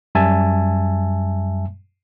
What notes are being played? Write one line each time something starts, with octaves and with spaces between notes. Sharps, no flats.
F#2 G3 E5 G#5 A5